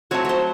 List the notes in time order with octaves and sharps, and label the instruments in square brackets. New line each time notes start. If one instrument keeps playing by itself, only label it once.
[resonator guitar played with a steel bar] F#3 A3 C4 F#4 [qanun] C#5
[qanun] C5 C#5